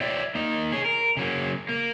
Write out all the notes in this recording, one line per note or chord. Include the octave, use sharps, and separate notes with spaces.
C#5 D5 E5 G5
A#3 D#4
G#4 C#5
A#4
C#3 F#3 A#3
A#3